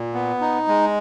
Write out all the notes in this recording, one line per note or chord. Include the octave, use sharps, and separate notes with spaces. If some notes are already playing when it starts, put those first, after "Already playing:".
Already playing: A#2
B3
D#4
G#3